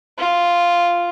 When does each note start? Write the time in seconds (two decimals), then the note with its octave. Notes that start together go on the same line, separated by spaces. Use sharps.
0.18 F4